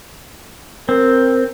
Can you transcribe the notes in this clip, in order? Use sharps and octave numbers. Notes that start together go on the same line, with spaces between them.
C4 A#4